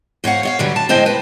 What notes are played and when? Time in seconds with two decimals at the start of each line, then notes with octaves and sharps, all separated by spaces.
0.24 G#2 C#5 F5 F#5
0.43 C#5 D#5 F5
0.59 G2 D3 F#3 G3
0.76 A5
0.89 A2 G#3 C5 D#5 G5 G#5
1.06 B4